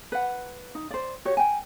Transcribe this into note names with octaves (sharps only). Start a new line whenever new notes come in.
B4 F#5
D#4
C5 D5
F#4 G4 C#5
G5 G#5